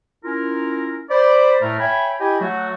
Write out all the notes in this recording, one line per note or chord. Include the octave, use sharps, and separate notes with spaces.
C#4 E4 F4 A#4
C5 D5 B5
A2 A3 A#4
C#5 E5 G5 G#5 B5
E4 G4 D#5 G5 G#5 B5
F#3 A3 F#4